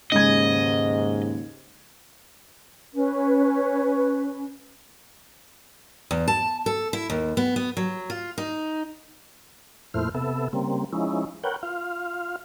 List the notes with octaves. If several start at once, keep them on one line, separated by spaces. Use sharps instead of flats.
D#2 G#2 C#3 G#3 D#5 G#6
C#4 B4
E2
A5
A4
E4
D#2
B3
B3
F#3
F4
D#4
F2 A#2 A3 E4 C5 F6
C3 B3 A4 E5
C#3 G3 A#3 C4
F3 G#3 C#4 D#4 E4
A#4 B4 C#5 F#5 G5
F4 F5